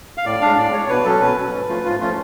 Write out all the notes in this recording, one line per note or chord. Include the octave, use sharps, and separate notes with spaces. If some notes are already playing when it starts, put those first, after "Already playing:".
F5
A2 D5
G#3 D4 F5
A2 D5
G#3 D4 C#5
B2 B4
F#3 C#4 A4
B2 B4
F#3 C#4
G#2
F3 A3 C#4 F4
G#2 F4
F3 A3 C#4 F4